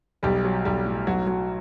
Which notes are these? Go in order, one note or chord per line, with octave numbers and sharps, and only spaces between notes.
B1 G3 G4
F#3
B1 G3 G4
A2
B1 F#3 F#4
F#3